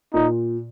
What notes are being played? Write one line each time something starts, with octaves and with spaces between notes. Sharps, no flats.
A#2 D#4